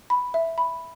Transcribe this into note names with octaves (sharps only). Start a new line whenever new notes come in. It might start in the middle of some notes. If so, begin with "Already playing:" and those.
B5
E5
B5